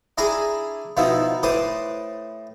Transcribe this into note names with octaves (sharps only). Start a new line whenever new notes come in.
D4 E4 G#4 G#5 A#5 B5
B2 F3 D#4 E4
A2 B4 C5 D6 D#6